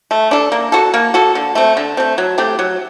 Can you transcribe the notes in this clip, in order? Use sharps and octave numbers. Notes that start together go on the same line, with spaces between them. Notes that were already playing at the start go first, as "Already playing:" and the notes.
A3
D4 A4
A#3
F#4 A4
A#3
F#4 A4
D3
A3 C4
D3
A3 C4
F#3
A3 C4 G4
F#3